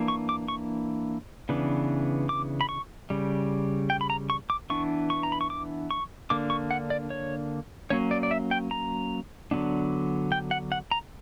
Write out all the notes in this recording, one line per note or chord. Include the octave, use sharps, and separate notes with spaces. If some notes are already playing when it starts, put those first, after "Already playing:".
Already playing: E3 A#3 D4
C#6
D6
C#6
C#3 E3 B3 D4
D6
B5
C#6
C#3 G3
G5
B5
A#5
C#6
D6
E3 B3 D4 C#6
C#6
A#5
B5
C#6
D6
C#6
D3 A#3 D4 D6
C#6
F#5
D5
C#5
F#3 A#3 C#4 C#5
D5
D5
E5
G5
A#5
D3 F#3 B3 D4
G5
F#5
F#5
A#5